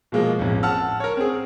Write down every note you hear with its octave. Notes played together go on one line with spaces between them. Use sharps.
B2 F3 G#3 A#3
A1 F2
F#5 A5 E6 F6
A#4 C#5
C4 G#4